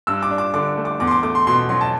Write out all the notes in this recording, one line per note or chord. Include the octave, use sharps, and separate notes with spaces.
G2 E6
D6
D4
D6
D3 D6
A3
D6
E2 D6
C6
D6
A3 D6
C6
B2 C6
F#3 C6
A5